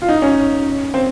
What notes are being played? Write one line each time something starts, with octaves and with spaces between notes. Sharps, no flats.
F4
D#4
C#4
C4